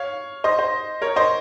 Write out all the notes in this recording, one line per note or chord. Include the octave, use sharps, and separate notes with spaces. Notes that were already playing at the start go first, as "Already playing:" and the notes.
Already playing: C#5 F5
C5 D#5
C5
A#4 C#5
C5 D#5